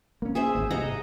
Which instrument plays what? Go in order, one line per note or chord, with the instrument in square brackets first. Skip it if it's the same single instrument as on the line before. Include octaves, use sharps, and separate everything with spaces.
[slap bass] A#3 C#4
[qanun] G#4 C5 E5
[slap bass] G#1
[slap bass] G2 C3 [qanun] D#5 F#5 A#5